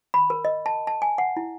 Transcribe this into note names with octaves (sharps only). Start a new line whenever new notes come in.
B5
A#4
D#5
A5
A5
G#5
F#5
E4